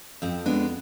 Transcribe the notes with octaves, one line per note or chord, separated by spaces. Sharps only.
F2 C4
G#3 B3 D4